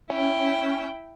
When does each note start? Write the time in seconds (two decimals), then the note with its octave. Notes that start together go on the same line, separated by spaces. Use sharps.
0.10 C#4 E4 G5